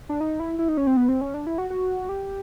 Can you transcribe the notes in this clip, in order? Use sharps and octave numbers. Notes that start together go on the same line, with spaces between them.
D4
D#4
E4
E4
D#4
C#4
C4
B3
C4
C#4
D4
E4
F#4
F#4
G4